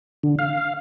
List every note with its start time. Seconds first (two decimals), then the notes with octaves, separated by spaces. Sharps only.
0.23 D3
0.39 F5